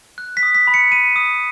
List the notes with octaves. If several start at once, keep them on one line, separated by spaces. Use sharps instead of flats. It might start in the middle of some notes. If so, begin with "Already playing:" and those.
F#6
B6
D#6
B6
B5
C#7
B5 D#7
D#6